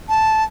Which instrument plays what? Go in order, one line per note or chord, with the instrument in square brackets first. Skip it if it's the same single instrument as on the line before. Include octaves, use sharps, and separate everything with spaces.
[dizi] A5